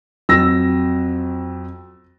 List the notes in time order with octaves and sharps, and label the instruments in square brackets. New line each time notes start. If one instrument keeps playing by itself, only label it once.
[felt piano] F2 F#3 [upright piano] E6 A#6